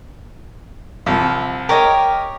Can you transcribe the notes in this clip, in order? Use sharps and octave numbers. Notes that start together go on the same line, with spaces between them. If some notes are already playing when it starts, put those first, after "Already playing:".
C2 F3 E5
G4 A#4 C#5 D#5